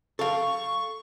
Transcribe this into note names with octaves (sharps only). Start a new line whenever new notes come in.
A4 F5 C#6